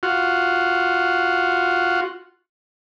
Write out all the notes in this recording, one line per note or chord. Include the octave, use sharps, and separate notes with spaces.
F4 F#4